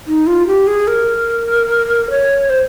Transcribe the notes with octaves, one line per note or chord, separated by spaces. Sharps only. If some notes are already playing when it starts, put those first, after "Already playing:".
D#4
F4
G4
G#4
A#4
C#5
C5